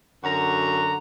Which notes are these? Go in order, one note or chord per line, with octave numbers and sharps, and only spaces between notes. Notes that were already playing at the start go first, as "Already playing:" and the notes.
F#2 D3 F#4 A#5